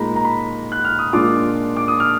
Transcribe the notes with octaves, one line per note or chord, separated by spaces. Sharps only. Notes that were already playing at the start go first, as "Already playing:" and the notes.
Already playing: A#2 G#3 D#4 A#5 B5
A#5
B5
F#6
F6
D#6
A#2 G#3 D4 F4 D6
D6
D#6
F6